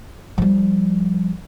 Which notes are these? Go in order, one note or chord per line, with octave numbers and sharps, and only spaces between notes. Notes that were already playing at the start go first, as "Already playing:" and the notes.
F3 G3